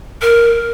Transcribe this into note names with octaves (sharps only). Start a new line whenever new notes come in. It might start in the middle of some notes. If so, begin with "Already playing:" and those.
A#4